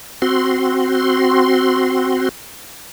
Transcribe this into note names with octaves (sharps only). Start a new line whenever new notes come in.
C4 F#4 C6